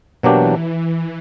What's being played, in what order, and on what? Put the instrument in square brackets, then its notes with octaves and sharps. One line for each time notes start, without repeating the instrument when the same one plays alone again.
[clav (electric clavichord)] B2 F#3 A#3 D4 G4 [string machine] E3